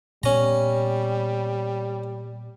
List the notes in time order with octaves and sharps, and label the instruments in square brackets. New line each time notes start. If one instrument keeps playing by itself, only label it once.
[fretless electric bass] A#2 B3 [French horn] G3 [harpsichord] C#4 A#5